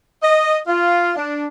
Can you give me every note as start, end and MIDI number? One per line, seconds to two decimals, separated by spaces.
0.23 0.58 75
0.67 1.13 65
1.16 1.46 62